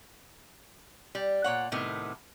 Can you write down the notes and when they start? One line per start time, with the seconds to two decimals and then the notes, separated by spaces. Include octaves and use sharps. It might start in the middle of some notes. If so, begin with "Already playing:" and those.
1.15 G3
1.44 A#2 C#5 F#5
1.72 A2 C3 D#3 B3